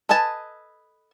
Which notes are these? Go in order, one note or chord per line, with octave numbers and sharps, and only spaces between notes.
A4 B4 D#5 G#5 A5